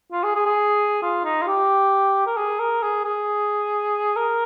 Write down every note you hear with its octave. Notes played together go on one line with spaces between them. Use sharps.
F4
G#4
G#4
G#4
F4
D#4
F4
G4
A#4
G#4
A#4
G#4
G#4
A#4